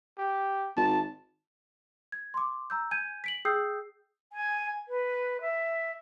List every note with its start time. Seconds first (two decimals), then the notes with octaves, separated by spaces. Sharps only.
0.18 G4
0.77 G#1 A5
2.12 G#6
2.34 C6 D6
2.70 A#5 E6 G6
2.91 G#5 G6 G#6 D#7
3.24 B6 D7 F#7
3.45 G#4 G5 D#6 E6 G6 C7
4.33 G#5
4.88 B4
5.41 E5